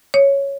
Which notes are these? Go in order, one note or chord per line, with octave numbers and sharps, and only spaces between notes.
C#5